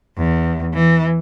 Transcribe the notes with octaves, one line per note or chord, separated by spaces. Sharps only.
E2
E3